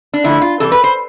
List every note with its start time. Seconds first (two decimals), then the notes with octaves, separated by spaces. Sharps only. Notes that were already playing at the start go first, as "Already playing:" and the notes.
0.14 D4
0.24 D3 F3 A3 E4
0.42 F4
0.60 C3 E3 G3 A4
0.72 B4
0.84 C5